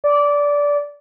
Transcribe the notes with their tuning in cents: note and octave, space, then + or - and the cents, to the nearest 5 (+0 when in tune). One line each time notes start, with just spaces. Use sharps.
D5 -15